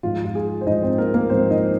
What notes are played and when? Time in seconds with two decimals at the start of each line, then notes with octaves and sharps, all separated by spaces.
0.03 G#2 F3 F4
0.25 F4
0.35 G#4
0.61 C5
0.67 G#2 F3 D#4 D#5
0.82 C4 C5
0.98 A#3 A#4
1.14 A#3 A#4
1.30 G#2 F3 C4 C5
1.51 D#4 D#5